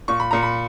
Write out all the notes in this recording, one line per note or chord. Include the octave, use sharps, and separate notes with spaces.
A#2 C#6
B5
A#2 A#5
B5